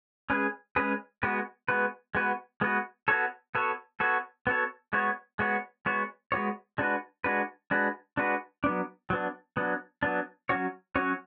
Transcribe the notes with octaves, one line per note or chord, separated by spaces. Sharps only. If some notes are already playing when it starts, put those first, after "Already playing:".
G#3 C#4 G#4 B4
G#3 C#4 G#4 B4
G#3 B3 F#4 B4
G#3 B3 F#4 B4
G#3 B3 F#4 B4
G#3 B3 F#4 B4
B3 F#4 A4 C#5
B3 F#4 A4 C#5
B3 F#4 A4 C#5
B3 F#4 A4 C#5
G#3 B3 F#4 C#5
G#3 B3 F#4 C#5
G#3 B3 F#4 C#5
G#3 B3 F#4 C#5
G#3 D4 F#4 B4
G#3 D4 F#4 B4
G#3 D4 F#4 B4
G#3 D4 F#4 B4
F#3 B3 D4
F#3 B3 D4
F#3 B3 D4
F#3 B3 D4
F#3 C#4 F#4 C#5
F#3 C#4 F#4 C#5